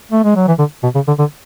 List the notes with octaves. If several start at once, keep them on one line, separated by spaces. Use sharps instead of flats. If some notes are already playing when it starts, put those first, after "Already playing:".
A3
G#3
F#3
E3
D3
B2
C#3
D3
D3